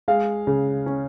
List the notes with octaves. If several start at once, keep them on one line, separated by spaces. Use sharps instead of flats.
G#3 F5
C#3
C#4